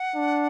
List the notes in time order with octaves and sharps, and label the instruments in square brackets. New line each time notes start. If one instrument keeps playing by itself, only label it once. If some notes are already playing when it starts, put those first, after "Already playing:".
Already playing: [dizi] F#5
[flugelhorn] D4